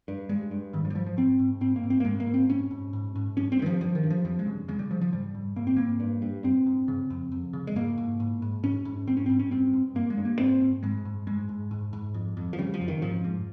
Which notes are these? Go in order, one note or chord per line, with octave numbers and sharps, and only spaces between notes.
G2
G2 G#3
G2
G#2 D#3
F3
G3
G#2 F3
F3
G#2 C4
G#2
G#2 C4
A#3
G#2
C4
A#3
G#2 G#3
A#3
G#2
C4
G#2 C#4
G#2
G#2
G#2
G2 C#4
C4
G2 D#3
F3
G2 F3
D#3
G2
F3
F2 F3
G#3
C#3
C#3 G#3
G3
C#3 F3
F3
G#2 G3
G#2
G#2 A#3
C4
G#2 A#3
G2
G2
G2 C4
G2
C#3
F2
F2
C#3
G#3
G#2 A#3
G#2
G#2
G#2
G#2 C#4
G#2
G#2 C4
C#4
G#2 C4
C#4
G2 C4
G2
G2 A#3
G#3
G2
A#3
G#2 C4
G#2
G#2 G#3
G#2
G#2 G#3
G#2
G#2
G#2
F2
F2
F3
C#3 G3
F3
F2
D#3
G#2 F3
G#2